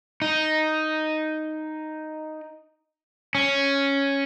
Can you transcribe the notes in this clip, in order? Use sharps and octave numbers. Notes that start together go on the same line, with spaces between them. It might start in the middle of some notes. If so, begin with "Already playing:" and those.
D#4
C#4